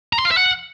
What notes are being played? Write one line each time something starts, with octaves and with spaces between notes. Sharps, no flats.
A#5
C6
F5
E5
F#5